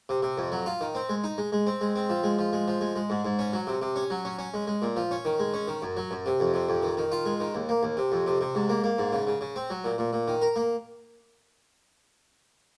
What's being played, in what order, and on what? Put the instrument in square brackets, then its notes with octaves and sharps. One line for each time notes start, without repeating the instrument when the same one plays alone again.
[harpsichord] C3
C3
F2
F#3
F4
D#3
C4
G#3
D#4
G#3
G#3
C4
G#3
C4
F3
G#3
F3
G#3
F3
G#3
G#3
G#2
G#2
C#4
F#3
C3
C3
C#4
F#3
C#4
C#4
G#3
G#3
A#2
F3
C#4
D#3
G#3
C#4
D#3
F#2
F#3
F#2
C3
F2
C3
F2
D#3
D#3
F4
G#3
D#3
D#2
A#3
D#2
C3
F2
C3
C3
G#2
A#3
A#3
G#2
C#3
C#3
C#3
C4
F#3
A#2
A#2
A#2
D#3
A#4
A#3